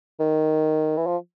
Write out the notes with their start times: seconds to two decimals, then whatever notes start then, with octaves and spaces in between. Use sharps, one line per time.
0.20 D#3
0.97 E3
1.06 F3